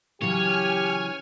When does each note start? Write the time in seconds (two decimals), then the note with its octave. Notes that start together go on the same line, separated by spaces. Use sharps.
0.22 C#3 E3 F#3 G4 C#5 G#5 F6